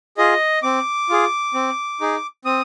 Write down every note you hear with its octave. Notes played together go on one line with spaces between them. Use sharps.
F4 G#4 D#5
C4 D6
F4 G#4
C4
D#4 G#4
C4 D#6